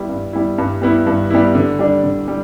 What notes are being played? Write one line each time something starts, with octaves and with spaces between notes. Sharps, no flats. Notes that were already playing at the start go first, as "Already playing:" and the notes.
Already playing: G3 B3 E4
G2
G3 B3 E4
G2
G3 B3 E4
G2
G3 B3 E4
D3
G3 D4
D3
G3